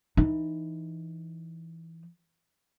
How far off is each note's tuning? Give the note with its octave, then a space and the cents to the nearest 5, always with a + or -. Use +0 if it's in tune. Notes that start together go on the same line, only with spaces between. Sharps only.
E3 +0 D#4 +0